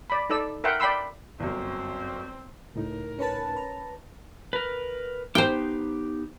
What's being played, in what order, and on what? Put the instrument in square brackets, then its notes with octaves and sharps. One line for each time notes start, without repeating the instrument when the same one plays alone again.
[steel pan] D5 B5
D#4 A4 D5 E6
A#4 E5 F#5 G5 C6
D5 G5 B5 C6 E6
[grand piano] G1 F#2 [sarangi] C4
[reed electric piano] C#2 A2 D#4 [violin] A#4
[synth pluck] C#4 B4 A5
A#5
[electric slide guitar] A#4 B4
[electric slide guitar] B3 D#4 G4 [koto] C5 G5